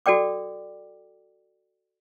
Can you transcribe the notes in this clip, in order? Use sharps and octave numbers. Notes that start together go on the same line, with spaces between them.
F#4 A4 D5 G5 D6